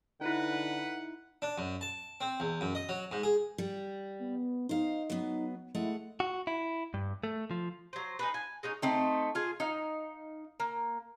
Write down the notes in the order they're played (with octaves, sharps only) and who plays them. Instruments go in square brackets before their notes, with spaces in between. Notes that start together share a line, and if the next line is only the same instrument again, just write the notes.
[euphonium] D3 [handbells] D#4 E4 [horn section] B4 [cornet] F#5
[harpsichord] D4
F#2
A5
C4
E2
F#2
D#5
F#3
G#2
G#4
[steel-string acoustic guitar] G3
[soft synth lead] B3
[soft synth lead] D#4 [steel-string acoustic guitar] C5 F5
[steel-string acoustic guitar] F#3 B3
[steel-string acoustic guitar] G#3 A3 F#5 [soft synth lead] E4
[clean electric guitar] F#4
E4
G2
A3
F3
[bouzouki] F#3 C5
D#4 G#4 B4
G#5
G#3 C#4 D#4
A3 C4 D#4
F4 G#4
D#4 F5
A#3